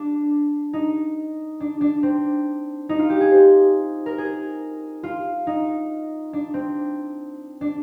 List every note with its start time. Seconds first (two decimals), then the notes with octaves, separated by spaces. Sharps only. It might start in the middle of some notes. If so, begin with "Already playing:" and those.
Already playing: D4
0.73 D#4
1.60 D4
1.81 D4
2.03 C4
2.89 D#4
2.99 F4
3.10 G4
3.21 G#4
3.31 C5
4.06 A#4
4.18 G#4
5.03 F4
5.47 D#4
6.33 D4
6.54 C4
7.61 D4